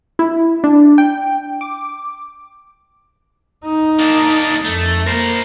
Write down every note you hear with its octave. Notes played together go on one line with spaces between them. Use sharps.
E4
D4
G5
D6
D#4
A#3 D4
F2 A3
A#3 A#4 C5